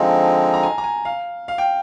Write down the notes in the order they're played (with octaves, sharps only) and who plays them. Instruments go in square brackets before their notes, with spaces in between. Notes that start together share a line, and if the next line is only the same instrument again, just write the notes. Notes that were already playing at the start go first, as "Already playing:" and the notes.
Already playing: [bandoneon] D3 F3 G#3 C4 D#4 [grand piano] F5
[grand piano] A#5
G#5
A#5
G#5
F5
F5
G5